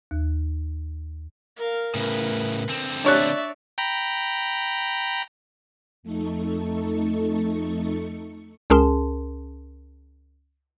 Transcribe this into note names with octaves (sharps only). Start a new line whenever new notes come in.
D#2
A#4 F5
A2 C#3 A#4 B4
D3 C4
D4 C#5 D5 E5 F#6
G5 A#5 B5
F2 A3 D#4 A4 C#6 C#7
C#2 C#4 G#4 A#4 A5 C6